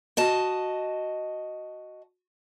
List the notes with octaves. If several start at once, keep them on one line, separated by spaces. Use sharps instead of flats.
F#4 D#5 A5